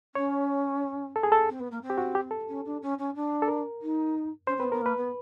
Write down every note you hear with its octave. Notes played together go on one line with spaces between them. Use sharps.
C#4 C#5
A4
G#4
A4
C4
B3
A#3
C4
G4
F#4
G4
A4
C#4
D4
C#4
C#4
D4
A4
A#4
D#4
C#4 C5
C4
B3 B4
B3 A#4
A#3 B4
B3